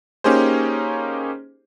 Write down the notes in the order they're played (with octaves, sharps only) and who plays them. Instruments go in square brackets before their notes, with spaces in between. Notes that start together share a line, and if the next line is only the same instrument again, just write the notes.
[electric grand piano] A#3 C#4 D#4 G4 G#4 C5